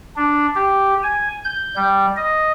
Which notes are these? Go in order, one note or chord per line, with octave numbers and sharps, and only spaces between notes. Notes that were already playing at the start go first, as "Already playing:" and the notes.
D4
G4
G#5
G6
G3
D#5